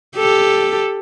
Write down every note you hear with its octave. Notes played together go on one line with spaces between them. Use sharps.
G4 A4